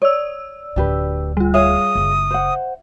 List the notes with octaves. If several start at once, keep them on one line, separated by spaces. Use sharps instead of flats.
C#5 D5 E6
D1 D2 D4 G4 B4
G3 F4
G#4 C#5 E5 F5 D#6
F#1
C5 F#5